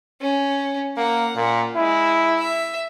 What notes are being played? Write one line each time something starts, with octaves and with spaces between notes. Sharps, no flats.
C#4
A#3 F#5
A#2
G#3 E4
E5